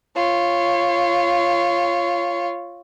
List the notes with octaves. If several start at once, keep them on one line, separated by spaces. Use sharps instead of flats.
F4 C#5